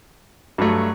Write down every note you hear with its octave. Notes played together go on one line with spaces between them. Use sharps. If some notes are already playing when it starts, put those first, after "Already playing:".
G2 F#3 A3